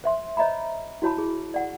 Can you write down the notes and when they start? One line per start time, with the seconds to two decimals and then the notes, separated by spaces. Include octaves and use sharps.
0.04 C5 E5 C6
0.37 C5 C#5 D#5 E5 A#5 B5
1.02 E4 F#4 C#5 A5 B5
1.18 G#4
1.54 D5 F#5